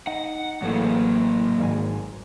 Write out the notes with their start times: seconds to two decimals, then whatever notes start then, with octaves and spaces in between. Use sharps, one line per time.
0.07 D#4 F#5
0.62 A1 A2 F#3 A#3
1.58 G#1 G#2 G#5